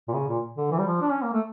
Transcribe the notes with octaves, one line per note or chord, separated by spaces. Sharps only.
A#2
C#3
A#2
D3
E3
G3
F3
D4
C#4
A#3
A3